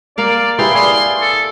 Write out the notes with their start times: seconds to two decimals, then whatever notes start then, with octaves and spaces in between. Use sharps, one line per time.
0.18 A#3 A#4 D5 F5
0.59 E4 G4 G#4 B4 F5 G5 C6
0.75 D5 G#5 C6 D#6
1.22 A4